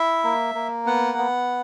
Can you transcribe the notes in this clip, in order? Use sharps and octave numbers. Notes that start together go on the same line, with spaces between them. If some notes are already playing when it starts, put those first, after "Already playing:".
Already playing: E4 E5
A#3
A#3
B3 F#5
B3